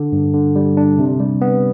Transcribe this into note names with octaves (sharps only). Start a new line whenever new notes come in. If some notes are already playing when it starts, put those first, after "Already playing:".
Already playing: D3
G2
D3
G3
D4
C3
G3
B3